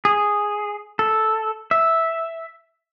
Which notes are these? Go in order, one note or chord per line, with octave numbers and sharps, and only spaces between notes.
G#4
A4
E5